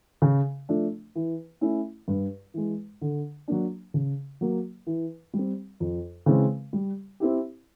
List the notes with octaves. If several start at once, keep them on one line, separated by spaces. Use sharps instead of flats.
C#3
F3 A3 D4
E3
A3 C#4 E4
G2
E3 G#3
D3
F#3 A#3 D4
C#3
F#3 A#3
E3
G3
C4
F2
C#3 E3 G#3 C4
G3
C4 E4 G4